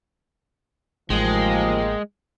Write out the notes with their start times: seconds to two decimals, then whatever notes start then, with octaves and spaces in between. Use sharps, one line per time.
1.10 A1 D#2 F3 G#3 A#3 D#5 G5